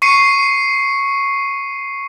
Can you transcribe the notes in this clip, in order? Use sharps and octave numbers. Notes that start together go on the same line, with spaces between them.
C#6 C7 C#7 D#7